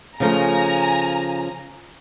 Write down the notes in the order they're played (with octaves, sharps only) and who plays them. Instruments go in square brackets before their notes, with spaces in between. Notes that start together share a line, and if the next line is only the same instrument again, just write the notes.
[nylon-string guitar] C#3 F3 A3 [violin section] G#5 A#5